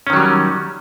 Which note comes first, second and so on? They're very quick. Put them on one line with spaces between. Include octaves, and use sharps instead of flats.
C#4 D#3 F#3 G3